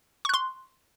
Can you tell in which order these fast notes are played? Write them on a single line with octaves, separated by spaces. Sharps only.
C#6 F#6 C6